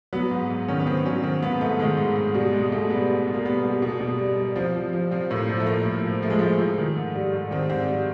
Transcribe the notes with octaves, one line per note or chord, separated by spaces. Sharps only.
F#3 B3
G#2
G#2
D#3 C#4
B3
D#3 C4
F#3 C#4
D#3 C4
G#2 B3
G#2 A3
D#3 G#3
G#2
G#2
B2 G3
G3 G#3
B2 A3
G3 B3
G3
B2
A#3
G3 B3
G3
B2
B2
G3
G3
F3 C4
F3
F3
F3 C4
A2 A#3
F3
A3
A2 A#3
A2
F3
F3 A3
G#3
F3 A3
F3
D#3
G#2
G3
G#2
D#3 C4
G#2 C4
G3